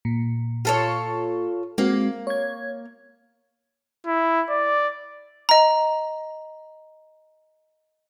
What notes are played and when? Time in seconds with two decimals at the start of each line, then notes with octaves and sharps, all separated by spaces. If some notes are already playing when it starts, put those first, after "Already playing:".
0.05 A#2
0.65 F4 A4 C#5
1.78 G#3 A#3 C4 F#4
2.27 C#5 G#6
4.07 E4
4.50 D5
5.49 D#5 A#5